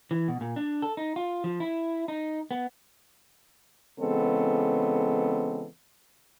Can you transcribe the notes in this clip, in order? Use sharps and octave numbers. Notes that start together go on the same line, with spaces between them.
E3
B2
A#2
D4
A4
D#4
F4
F3
E4
D#4
B3
C#3 E3 G#3 B3 C4 A4